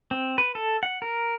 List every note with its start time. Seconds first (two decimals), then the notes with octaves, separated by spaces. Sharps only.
0.11 C4
0.38 B4
0.55 A4
0.83 F#5
1.02 A#4